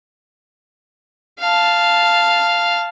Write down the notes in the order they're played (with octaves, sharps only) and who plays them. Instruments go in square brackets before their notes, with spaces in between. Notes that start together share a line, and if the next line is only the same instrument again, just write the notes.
[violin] F5 A5